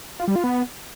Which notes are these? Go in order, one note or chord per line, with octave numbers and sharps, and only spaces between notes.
F4
G3
F4
B3